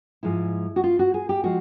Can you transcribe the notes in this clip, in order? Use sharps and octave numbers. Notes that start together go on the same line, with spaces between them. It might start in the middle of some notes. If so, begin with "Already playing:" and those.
G#2 F3 G#3 E4
F#4
F4
F#4
G#4
G4
F3 G#3 F#4